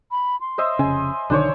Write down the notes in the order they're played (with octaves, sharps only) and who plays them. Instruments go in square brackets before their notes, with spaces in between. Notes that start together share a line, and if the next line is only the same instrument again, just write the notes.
[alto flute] B5
C6
[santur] C5 D#5 E5
[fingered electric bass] F1 C#3 [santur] G#5
[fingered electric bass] B1 D3 D#3 [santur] D4 C5 C#5